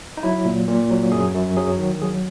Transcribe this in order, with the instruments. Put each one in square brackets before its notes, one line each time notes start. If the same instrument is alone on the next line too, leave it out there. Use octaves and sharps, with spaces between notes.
[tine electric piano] D#4
F#3 E4
A#2
A#2
F#3
F#2 G#4
F#2
F#3 G#4
D#3
F#3 G#4